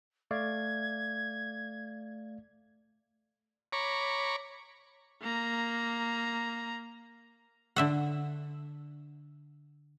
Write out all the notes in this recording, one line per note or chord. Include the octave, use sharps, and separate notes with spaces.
A3 D5 F5 G#6
C#5 A#5 B5 C#6 D6
A#3 A#5
D3 E5 F#5